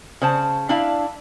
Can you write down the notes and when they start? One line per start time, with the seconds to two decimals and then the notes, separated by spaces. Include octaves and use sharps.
0.22 C#3 C5 A5
0.69 D4 E4 F5